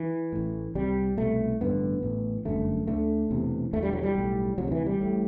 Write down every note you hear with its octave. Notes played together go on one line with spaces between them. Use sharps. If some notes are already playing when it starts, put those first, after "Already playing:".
Already playing: E3
A1 A2
C2 C3 G3
C2 B2 A3
A1 G2 D3 B3
A1 A2
G1 F#2 D3 A3
D2 D3 A3
E1 E2 C3
E1 E2 D3 A3
G3
F#3
G3
B1 A2
D2 C3 F#3
D3
E3
G3
A1 A2